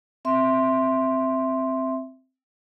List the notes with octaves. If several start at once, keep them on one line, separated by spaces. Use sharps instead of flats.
C4 E5 C6